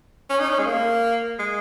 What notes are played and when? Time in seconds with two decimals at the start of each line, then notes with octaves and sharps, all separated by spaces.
0.29 C#4
0.39 D#4
0.49 C#4
0.59 G#3
0.66 A#3
1.39 G#3